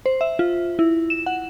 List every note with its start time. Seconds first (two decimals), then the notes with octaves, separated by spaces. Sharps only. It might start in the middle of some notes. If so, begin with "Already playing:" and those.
0.06 C5
0.21 E5
0.39 F4
0.79 E4
1.10 E7
1.26 F#5